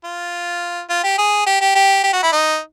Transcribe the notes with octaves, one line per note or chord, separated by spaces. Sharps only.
F4
F4
G4
G#4
G4
G4
G4
G4
F#4
E4
D#4